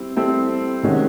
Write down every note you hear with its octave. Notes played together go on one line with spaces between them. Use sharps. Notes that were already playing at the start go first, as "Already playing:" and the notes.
Already playing: G3 C4 E4
G3 C4 E4 A4 C5
C3 D#3 G#3 C#4 F#4